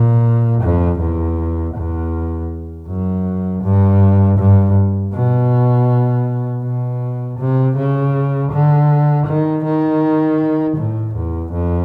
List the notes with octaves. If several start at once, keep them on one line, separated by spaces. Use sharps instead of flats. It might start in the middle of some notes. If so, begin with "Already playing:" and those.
Already playing: A#2
F2
E2
E2
F#2
G2
G2
B2
B2
C3
C#3
D3
D#3
D#3
A2
E2
F2